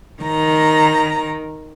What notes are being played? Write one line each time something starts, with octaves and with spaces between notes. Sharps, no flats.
D#3 A#5